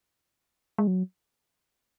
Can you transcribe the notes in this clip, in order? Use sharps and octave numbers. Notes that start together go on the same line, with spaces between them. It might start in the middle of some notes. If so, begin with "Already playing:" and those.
G#3
F#3